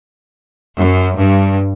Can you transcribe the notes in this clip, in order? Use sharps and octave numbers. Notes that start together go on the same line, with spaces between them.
F#2
G2